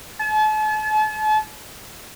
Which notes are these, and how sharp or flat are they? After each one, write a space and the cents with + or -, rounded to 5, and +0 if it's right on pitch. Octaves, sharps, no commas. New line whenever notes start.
A5 -40